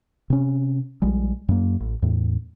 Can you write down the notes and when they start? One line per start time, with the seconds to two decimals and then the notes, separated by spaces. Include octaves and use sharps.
0.30 C3 C#4
1.02 A#1 G3 G#3
1.49 F#2 A#3
1.80 A1
2.02 E2 A2